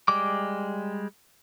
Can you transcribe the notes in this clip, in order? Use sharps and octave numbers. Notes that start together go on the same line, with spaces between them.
G3 G#3 D6